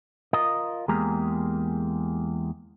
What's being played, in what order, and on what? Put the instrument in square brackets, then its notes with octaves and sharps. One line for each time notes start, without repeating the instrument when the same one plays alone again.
[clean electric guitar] F4 A#4 D#5
E2 G#3 A#3 G4 G#4 A#5